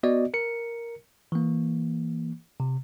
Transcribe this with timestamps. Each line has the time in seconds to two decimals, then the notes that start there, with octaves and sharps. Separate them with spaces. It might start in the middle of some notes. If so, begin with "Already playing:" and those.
0.03 B3 F#4 D5 D#5
0.34 A#4 C#7
1.32 E3 A#3
2.60 C3